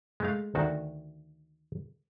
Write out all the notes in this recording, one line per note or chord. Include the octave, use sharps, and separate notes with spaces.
G#3 A3 F5
D2 D#3 F#4